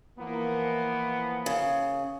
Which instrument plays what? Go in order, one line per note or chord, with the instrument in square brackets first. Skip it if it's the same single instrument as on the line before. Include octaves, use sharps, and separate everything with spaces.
[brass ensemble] E3 F3 A#3 [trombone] B3
[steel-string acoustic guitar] C#3